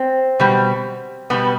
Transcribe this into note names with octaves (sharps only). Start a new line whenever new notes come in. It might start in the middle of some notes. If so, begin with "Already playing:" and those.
Already playing: C4
B2 G3
B2 G3 B3